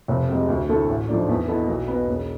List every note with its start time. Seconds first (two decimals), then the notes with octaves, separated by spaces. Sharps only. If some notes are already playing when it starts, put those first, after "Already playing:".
0.08 F1
0.28 F2 C3 G#3
0.48 D2
0.69 D3 A3 E4 A4
0.88 A1
1.08 G#2 F3 A3 D4
1.29 E2
1.48 B2 B3 E4 A4
1.67 B1
1.88 B2 B3
2.07 E1